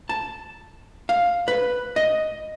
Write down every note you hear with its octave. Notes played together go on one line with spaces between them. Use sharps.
A5
F5
B4
D#5